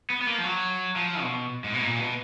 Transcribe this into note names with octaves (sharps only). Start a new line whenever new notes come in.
B3
B3
A#3
F3
F#3
F3
B2
G#2
B2
A#2
B2